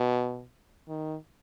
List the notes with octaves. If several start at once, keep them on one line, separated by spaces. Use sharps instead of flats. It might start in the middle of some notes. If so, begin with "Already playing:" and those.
Already playing: B2
D#3